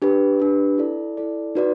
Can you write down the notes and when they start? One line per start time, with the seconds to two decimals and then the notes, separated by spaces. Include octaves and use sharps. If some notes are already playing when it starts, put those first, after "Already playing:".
0.02 D4 G4 B4
0.40 D4 G4 B4
0.78 E4 A4 D5
1.17 E4 A4 D5
1.55 D#4 F#4 B4 D5